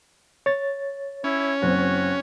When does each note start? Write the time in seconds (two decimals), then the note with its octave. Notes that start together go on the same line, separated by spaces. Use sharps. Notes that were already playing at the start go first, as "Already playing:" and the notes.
0.46 C#5 A6
1.24 C#4 E4
1.62 F#1 C4 F#4